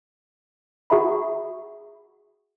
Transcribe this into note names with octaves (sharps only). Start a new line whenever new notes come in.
F#4 G#4 E5 A#5 B5